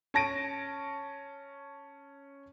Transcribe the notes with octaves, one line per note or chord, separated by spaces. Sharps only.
C#4 A5 A#6 D7 D#7